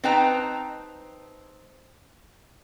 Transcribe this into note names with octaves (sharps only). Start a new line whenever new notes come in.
C4 D#4 B4 G5 A5 A#5